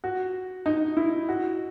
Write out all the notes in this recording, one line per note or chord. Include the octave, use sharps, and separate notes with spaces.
F#4
D#4
E4
F#4